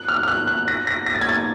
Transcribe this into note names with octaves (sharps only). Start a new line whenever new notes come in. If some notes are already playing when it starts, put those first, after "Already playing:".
Already playing: F#6
F6
F6
F#6
F#6
A#6
A#6
A#6
A6
G#6
A6